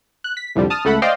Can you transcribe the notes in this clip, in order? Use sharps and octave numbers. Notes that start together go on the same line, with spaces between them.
F#6
B6
C2 F2 D3 G3
A5 D#6 F6
C#2 A3 A4 F#5 B5
C5 D5 D#5 F5 G5 C6